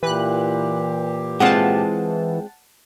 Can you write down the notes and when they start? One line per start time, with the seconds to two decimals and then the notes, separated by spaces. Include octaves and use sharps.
0.03 A#2 E3 G4 B4 F#6
1.40 G#3 C4 F4 F#5 A5